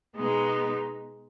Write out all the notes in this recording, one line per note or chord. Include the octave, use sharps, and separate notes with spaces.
B2 G#3 B3 D#4